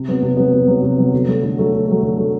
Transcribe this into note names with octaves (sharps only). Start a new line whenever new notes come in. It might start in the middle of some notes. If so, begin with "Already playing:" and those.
Already playing: C3
F#3 B3
C3
F#3 B3
C3
F#3 B3
C3
F#3 B3
D3
F#3 A3
D3
F#3 A3
D3
F#3 A3
D3
F#3 A3